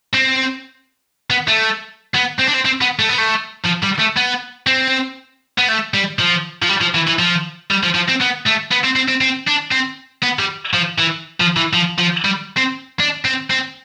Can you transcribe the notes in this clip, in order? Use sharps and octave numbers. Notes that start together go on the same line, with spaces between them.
C4
B3
A3
B3
C4
D4
C4
C4
B3
A3
B3
A3
F3
G3
A3
B3
C4
B3
A3
G3
F3
F3
G3
F3
E3
E3
F3
G3
F3
F3
C4
B3
A3
B3
C4
C4
C4
C4
D4
C4
B3
G3
F3
E3
F3
E3
F3
F3
G3
C4
D4
C4
C4